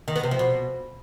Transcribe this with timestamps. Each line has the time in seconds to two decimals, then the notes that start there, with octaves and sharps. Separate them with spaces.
0.08 D#3
0.16 B3
0.23 C3
0.31 F3
0.39 B2